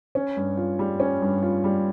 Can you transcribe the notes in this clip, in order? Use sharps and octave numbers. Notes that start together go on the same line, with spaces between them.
C#4
G2
F4
G3
C#4
G2
F4
G3